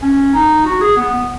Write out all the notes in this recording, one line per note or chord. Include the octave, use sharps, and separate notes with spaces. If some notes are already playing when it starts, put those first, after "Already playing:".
C#4
D#4
F#4
G#4
B3
B3